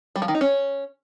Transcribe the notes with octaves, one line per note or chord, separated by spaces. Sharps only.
G3
F3
D#3
D#4
C#4